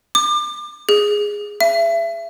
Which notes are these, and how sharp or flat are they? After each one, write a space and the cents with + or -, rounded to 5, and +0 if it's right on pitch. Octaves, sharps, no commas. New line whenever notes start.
D6 +35
G#4 -5
E5 +30